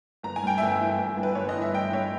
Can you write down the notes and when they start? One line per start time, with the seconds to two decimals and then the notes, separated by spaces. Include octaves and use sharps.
0.23 G1 A#5
0.36 G#5
0.43 G2 G5
0.58 G1 E5 G#5
0.80 E3
0.99 G1
1.17 G2
1.23 B4
1.35 G1 C#5
1.49 D#5
1.55 E3
1.62 E5
1.74 G1 D#5 G5
1.93 G2 C#5 E5